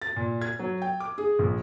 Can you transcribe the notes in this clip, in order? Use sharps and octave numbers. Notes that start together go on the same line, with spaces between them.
A6
A#2
G#6
F#3
G5
D6
G#4
A#1